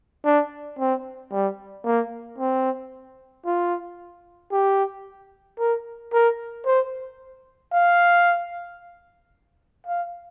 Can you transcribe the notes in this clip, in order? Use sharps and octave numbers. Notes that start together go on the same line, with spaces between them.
D4
C4
G3
A#3
C4
F4
G4
A#4
A#4
C5
F5
F5